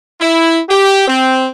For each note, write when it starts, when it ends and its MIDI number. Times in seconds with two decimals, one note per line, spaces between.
0.20 0.59 64
0.69 1.08 67
1.08 1.48 60